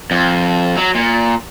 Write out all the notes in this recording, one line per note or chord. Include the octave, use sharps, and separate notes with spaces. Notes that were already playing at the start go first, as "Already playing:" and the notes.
F2
F#3
A#2